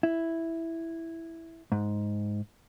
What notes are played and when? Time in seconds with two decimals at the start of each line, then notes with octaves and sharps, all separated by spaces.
0.03 E4
1.72 G#2